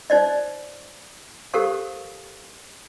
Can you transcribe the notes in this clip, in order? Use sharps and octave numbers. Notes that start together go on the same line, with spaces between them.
D#4 C5 D5 D#5
G4 A4 A#4 C5 F5 C#6